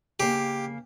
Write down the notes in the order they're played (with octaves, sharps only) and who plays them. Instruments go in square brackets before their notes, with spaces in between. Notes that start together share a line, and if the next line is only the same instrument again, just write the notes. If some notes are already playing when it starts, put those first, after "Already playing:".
[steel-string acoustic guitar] C#3 A#3 [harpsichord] G4